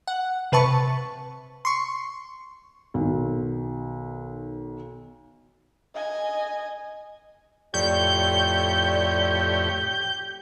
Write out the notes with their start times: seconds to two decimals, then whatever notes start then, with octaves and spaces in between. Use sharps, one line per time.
0.07 F#5
0.52 C3 B4 A5 C#6
1.65 C6 C#6
2.94 B1 D#3
5.95 D#5 G#5
7.74 F2 A2 G4 C#5 D5 G6